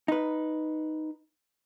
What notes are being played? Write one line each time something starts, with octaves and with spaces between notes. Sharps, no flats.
D#4 B4